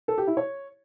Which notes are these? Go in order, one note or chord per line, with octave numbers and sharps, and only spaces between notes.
A4
G4
E4
C#5